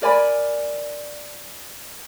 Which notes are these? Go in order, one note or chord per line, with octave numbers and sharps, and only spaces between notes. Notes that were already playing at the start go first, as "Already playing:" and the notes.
A#4 D5 G#5 B5